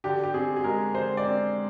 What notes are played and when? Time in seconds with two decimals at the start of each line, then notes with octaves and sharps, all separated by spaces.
0.04 D3 G4
0.23 G4
0.34 C4 G#4
0.56 G#4
0.64 G#3 A#4
0.94 D3 C5
1.17 D5
1.25 C4